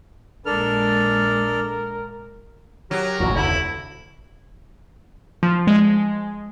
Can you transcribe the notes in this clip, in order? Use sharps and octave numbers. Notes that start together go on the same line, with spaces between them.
A#1 G#3 D4 A4 A#4 F6
F#3 G4 A#4
E1 A1 D#2 F#4
F1 D2 D3 E4
F3
G#3